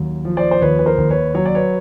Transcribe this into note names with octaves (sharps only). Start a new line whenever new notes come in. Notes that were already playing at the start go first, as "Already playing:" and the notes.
Already playing: D#2 F#3
F3
C5 D5
C5
D#2 B4 C#5
B4
A#4 C5
D#2
B4 C#5
F#3 C#5
D5
B4 C#5